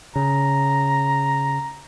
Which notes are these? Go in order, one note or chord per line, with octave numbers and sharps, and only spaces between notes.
C#3 A#5